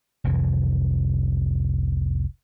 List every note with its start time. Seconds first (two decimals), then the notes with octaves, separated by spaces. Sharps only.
0.24 F1 C2 F2 E3